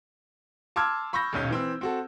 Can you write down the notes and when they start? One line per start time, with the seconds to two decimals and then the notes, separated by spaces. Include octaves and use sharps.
0.76 A5 C6 D6 E6 F6 G#6
1.13 B5 C#6 E6 G6 A#6
1.33 D#1 B1 C#4 G6
1.50 E3 C4 E6
1.81 C4 F#4 A4